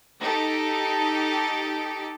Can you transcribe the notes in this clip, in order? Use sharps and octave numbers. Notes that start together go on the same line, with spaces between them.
D#4 G4 A4